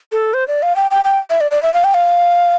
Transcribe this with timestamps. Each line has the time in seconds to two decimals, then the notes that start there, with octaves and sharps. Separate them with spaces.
0.12 A4
0.34 C5
0.48 D5
0.63 F5
0.76 G5
0.91 G5
1.05 G5
1.30 E5
1.41 D5
1.51 D5
1.63 E5
1.74 F5
1.84 G5
1.94 F5